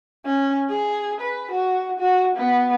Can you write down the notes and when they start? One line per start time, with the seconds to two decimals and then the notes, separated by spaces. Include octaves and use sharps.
0.25 C#4
0.70 G#4
1.20 B4
1.51 F#4
1.99 F#4
2.35 B3